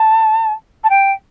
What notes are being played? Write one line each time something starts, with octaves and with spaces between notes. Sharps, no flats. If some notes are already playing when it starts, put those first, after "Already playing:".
Already playing: A5
A5
G5